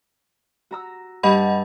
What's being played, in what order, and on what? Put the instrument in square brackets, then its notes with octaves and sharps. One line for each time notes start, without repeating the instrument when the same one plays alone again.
[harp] F#4 A#5 E6
[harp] G2 A5 [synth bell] D#5 F#5 B5